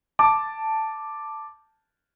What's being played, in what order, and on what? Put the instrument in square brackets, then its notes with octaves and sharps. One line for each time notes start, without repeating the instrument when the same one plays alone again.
[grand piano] A5 D6